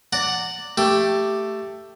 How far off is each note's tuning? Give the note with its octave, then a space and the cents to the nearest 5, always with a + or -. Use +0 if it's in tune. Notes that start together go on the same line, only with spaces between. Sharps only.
D5 +0 F#5 +0 A#5 -25
A3 +10 G4 +0